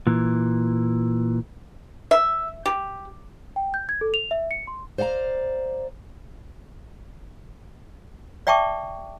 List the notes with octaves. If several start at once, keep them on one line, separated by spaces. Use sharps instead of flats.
A#2 E3
E5
G4
G5
G6
G#6
A4
F7
E5
C#7
C6
C5 D5 F5 F#5 A#5
D5 E5 G5 A5 C#6 D6